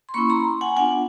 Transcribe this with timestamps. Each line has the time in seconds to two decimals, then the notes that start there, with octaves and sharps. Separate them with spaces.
0.09 C6
0.14 A#3 C#4 E4 B5 C#6
0.30 A#5 C6
0.61 F#5 G#5
0.76 B3 D4 F4 F#5 G#5